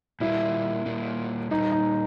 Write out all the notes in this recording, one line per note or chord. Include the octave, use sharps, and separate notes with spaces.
A#2 G3 A#3 E4
A#2 G3 A#3
A#2 G3 A#3 D#4
D#4